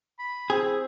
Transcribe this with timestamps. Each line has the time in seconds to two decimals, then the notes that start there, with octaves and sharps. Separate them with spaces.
0.19 B5
0.50 C4 G#4